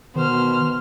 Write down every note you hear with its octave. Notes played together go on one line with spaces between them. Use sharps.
B2 D#3 B3 C5 F6